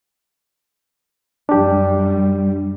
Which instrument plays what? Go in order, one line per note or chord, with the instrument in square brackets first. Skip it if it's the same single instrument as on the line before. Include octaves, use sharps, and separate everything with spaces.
[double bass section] F#2 G3 [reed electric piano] D4 G4